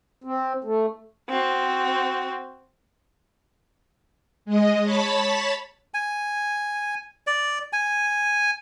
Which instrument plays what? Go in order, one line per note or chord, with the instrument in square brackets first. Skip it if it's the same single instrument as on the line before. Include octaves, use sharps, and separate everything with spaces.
[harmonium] C4
A3
[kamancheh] C4 F#4
[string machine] G#3 D#5
C#5 A5 B5 A6 B6
[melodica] G#5
D5
G#5